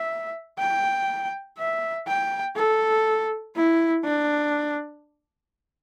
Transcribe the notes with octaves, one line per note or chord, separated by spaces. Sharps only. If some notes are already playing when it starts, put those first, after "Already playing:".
Already playing: E5
G5
E5
G5
A4
E4
D4